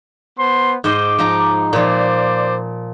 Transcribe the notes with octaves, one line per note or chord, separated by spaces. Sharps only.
B3 C5 C6
G#2 C5 D#5 D6
F3 D#4 A#5
A#2 F3 C5 D5